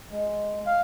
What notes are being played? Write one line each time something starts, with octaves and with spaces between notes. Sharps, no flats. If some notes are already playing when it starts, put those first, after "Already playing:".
G#3
F5